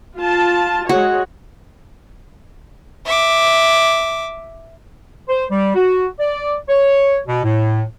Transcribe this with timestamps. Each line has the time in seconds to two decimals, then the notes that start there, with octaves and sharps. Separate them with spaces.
0.17 F4 A5
0.89 G#3 F#4 G#4 C#5
3.06 E5 D6
5.29 C5
5.51 G3
5.75 F#4
6.19 D5
6.69 C#5
7.27 B2
7.44 A2